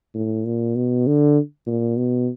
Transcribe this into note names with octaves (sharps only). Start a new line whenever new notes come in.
A2
A#2
B2
D3
A#2
B2